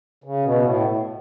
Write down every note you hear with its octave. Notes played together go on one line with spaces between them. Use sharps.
C#3
B2
A2